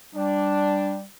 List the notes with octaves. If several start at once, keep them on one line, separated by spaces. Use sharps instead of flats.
G3 D4